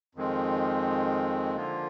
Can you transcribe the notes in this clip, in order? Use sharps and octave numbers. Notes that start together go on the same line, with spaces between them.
F2 D#3 G#3 C4
D3 F3 A#3 F4